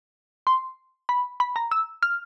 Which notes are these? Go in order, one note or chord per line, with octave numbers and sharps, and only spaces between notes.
C6
B5
B5
A#5
E6
F6